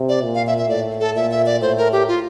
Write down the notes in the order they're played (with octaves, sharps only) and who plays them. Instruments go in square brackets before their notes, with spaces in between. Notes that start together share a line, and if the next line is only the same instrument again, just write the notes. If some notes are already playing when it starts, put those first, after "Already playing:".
Already playing: [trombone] C3
[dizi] D5
[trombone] A#2
[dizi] F5
E5
E5
[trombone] A2 [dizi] D5
[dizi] A4
[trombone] A#2 [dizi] E5
[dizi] E5
D5
[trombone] A2 [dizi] C5
[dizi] A#4
G4
F4